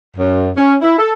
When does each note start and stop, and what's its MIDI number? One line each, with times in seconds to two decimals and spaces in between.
0.17 0.49 42
0.57 0.76 61
0.81 0.96 64
0.99 1.13 69